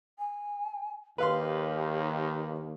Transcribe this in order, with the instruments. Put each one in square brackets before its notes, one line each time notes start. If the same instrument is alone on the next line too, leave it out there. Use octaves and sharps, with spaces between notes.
[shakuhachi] G#5
[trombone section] D#2 [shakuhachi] G4 [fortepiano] B4 F5 C6